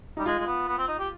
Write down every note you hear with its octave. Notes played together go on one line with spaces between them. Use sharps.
G3 D#4
G#3 F4
G#3
B3
B3
C4
D#4
G4